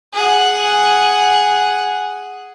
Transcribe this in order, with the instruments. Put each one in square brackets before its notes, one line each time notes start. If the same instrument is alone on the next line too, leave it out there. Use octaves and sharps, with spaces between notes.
[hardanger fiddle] G#4 F#5